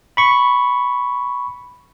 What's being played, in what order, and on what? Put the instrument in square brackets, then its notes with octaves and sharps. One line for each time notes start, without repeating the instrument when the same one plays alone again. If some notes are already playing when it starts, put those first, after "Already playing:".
[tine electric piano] B5 C#6